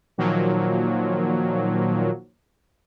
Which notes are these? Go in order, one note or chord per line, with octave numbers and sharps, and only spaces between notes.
A#2 D#3 F3 F#3 A#3